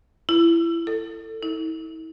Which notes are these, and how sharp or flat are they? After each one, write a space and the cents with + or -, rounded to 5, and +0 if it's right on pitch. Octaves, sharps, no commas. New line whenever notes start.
E4 +25
A4 +20
E4 -35